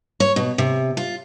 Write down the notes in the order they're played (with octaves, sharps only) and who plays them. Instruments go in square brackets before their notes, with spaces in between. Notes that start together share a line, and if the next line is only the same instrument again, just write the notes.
[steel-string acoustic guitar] C#5
B2
C3
F4